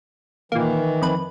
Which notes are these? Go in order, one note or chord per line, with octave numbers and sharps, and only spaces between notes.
A#2 D#3 E3 A#3
F2 B4